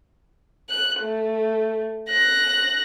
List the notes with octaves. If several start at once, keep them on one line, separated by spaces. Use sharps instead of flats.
F#6
A3
F#6 A#6